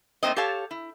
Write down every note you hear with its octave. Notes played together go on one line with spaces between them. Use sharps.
G#2 A3 A#3 C4 D#5
G4 A4 C#5 F5 A5
E4